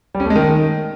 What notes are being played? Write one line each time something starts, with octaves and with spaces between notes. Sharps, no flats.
G3
C#4
A3
G#3
D#3